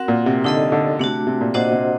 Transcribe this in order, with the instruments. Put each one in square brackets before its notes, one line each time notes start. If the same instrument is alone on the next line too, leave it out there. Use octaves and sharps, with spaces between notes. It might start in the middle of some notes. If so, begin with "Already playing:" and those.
Already playing: [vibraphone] C4 F#4 A#4 F#5
[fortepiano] A#2
C3
[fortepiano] D3 [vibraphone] D#4 A4 D#5
[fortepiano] D3
[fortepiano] C3 [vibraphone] A3 D4 F#4
[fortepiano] C3
A#2
[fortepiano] A#2 [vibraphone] D4 F#4 C5 D#5 F#5
[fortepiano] C3